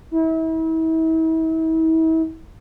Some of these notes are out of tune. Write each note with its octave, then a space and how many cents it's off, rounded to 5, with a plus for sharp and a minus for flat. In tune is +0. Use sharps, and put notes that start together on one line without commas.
E4 -40